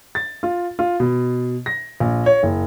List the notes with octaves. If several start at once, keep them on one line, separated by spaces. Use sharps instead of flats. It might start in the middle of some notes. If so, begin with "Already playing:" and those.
A6
F4
F4
B2
A#6
A#1
C#5
F#1